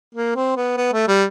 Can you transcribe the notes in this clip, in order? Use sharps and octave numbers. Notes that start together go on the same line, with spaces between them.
A#3
C4
B3
B3
A3
G3